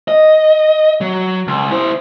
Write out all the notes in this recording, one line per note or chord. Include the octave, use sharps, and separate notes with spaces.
D#5
F#3
C#2
E4 C5